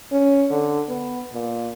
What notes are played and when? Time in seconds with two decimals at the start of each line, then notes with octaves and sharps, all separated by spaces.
0.12 C#4
0.51 D3
0.88 B3
1.33 A#2